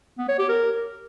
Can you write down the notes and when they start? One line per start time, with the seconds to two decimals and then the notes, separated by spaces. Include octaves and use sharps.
0.18 B3
0.29 C#5
0.39 G4
0.49 A#4